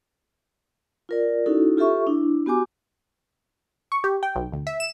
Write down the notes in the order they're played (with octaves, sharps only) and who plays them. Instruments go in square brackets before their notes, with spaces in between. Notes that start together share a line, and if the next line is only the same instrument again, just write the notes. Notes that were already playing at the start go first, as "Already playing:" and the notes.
[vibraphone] F4 A#4 D5
C#4 D#4 E4 F#4 A4
F4 G4 A4 E5 C#6
D4 E4
B3 F#4 G4 G#5 D6
[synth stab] C#6
G4
G5
B1
D2
E5
E7